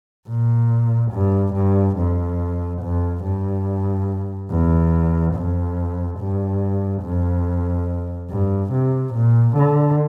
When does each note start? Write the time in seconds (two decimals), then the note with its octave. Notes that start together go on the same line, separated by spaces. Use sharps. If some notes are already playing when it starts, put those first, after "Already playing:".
0.29 A#2
1.12 G2
1.54 G2
1.98 F2
2.82 F2
3.24 G2
4.51 E2
5.35 F2
6.19 G2
7.03 F2
8.30 G2
8.73 C3
9.14 A#2
9.57 D3